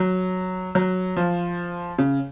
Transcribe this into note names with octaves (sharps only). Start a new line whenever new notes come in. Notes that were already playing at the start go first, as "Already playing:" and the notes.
Already playing: F#3
F#3
F3
C#3